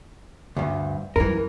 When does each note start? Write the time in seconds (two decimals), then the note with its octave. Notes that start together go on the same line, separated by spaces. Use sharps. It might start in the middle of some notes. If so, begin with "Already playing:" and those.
0.57 D2 G2
1.16 F#2 E3 G3 A#4